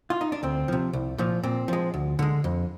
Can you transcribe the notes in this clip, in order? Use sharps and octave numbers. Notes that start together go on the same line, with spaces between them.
F4
D#4
D4
D2 C4
C3 F3
C2
A#2 F3
A#2 C4
F3 G#3
D2
D3 G#3
F2